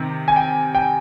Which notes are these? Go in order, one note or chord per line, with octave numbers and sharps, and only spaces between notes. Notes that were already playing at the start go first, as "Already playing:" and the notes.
Already playing: C3 D#3
G#5
G5
G5